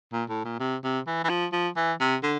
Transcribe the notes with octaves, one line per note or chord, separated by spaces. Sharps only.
A#2
A2
A#2
C3
C3
E3
E3
F3
F3
E3
C3
D3